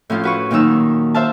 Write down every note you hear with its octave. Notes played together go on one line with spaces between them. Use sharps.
A2 F3 C#4 F4
F#4 B4 C#6
A#2 D#3 F#3 D#4 E6
C5 E5 F5 A5